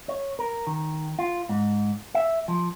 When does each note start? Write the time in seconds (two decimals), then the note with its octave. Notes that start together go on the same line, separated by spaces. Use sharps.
0.08 C#5
0.39 A#4
0.67 D#3
1.19 F4
1.49 G#2
2.15 E5
2.48 F3